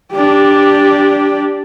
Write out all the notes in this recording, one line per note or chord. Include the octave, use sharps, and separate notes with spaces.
D4 G4